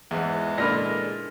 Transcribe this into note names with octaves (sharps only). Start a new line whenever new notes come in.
E2 G#2 E3 G#3 F#5
A#2 D3 A#4 D5 B5 F6 A#6